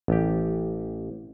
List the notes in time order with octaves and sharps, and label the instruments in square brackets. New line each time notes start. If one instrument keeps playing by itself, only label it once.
[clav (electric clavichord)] A1 G4